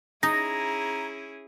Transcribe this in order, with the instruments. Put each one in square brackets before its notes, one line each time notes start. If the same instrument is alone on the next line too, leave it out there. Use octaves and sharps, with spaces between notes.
[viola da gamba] C#4 E4 G#4 [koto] D#4 [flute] A#5 [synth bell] A#6